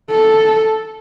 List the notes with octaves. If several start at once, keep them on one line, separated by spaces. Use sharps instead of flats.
A4